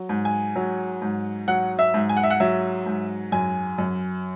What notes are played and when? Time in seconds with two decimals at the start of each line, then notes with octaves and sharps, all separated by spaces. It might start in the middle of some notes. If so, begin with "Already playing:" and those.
Already playing: F#3
0.09 G#2
0.25 G#5
0.56 F#3
1.02 G#2
1.48 F#3 F#5
1.79 E5
1.94 G#2
2.09 G#5
2.17 F#5
2.23 E5
2.30 F#5
2.40 F#3 E5
2.86 G#2
3.32 F#2 G#5
3.78 F#2